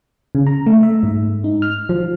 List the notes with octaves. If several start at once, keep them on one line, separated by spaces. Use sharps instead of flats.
C#3
A#5
A3
E5
G#2
D#4
F6
F3